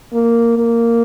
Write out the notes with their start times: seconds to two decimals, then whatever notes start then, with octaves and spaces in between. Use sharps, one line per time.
0.13 A#3
0.58 A#3